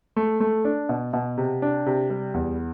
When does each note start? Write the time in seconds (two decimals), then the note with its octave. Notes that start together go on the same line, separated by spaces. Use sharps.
0.16 A3
0.40 A3
0.65 D4
0.89 B2
1.13 B2
1.37 C3
1.62 D4
1.86 C3
2.10 G3
2.34 E2